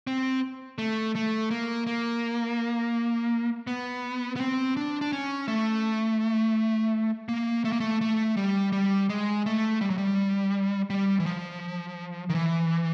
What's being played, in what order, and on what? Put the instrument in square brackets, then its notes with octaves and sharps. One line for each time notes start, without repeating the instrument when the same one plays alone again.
[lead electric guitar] C4
A3
A3
A#3
A#3
B3
B3
C4
D4
D4
C#4
A3
A#3
A3
A#3
A3
A3
G3
G3
G#3
A3
G3
F#3
G3
G3
E3
F3
D#3
E3